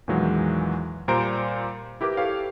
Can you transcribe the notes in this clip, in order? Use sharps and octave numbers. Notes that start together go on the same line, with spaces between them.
E2 A#2 D#3 E3 F#3 G#3
A#2 G3 C5 A#5 D7
E4 G4 A#4 B4 D6
G4 A4 B4 C#5 F5